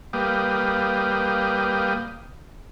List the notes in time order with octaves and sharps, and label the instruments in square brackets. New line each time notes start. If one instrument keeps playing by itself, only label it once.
[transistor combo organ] G3 A#3 B4 F5 G5 D#6